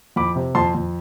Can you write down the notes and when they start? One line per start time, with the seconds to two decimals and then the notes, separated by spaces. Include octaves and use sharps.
0.16 F2 B5 D6
0.36 C3
0.55 F2 A5 C6
0.75 F2